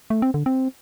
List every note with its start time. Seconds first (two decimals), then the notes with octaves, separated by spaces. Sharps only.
0.10 A3
0.22 C4
0.34 D3
0.46 C4